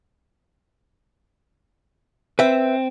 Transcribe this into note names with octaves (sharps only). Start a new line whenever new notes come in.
C4 B4 E5